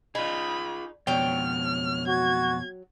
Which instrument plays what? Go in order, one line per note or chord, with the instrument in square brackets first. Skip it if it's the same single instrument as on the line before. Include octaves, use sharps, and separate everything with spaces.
[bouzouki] D#4 [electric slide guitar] F4 G#4 [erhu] B5
[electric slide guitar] F2 B2 [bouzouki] F#3 G5 [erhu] F6
[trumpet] F#4 [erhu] G#6